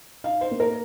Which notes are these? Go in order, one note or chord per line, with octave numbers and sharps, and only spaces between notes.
D#4 F5
C5
A#3
A#4